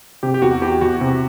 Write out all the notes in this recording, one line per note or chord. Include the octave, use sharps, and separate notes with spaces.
C3 G4
G4
E2 F#4
E2 G4
E2 F#4
C3